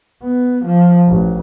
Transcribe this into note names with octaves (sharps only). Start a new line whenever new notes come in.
B3
F3
A1